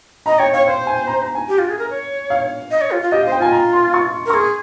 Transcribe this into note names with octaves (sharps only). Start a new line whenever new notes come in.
D#5 A#5
C#5 G5
C#5 F5
C5 F5
G#5
A#5
A#5
G#5
G4
F4
G#4
A#4
C#5
F5
D#5
C#5
F4
F4
G4 D#5
F5
C5
G5
F4 G#5
A#5
C6
C#6
A#4
C#6
G#4 C6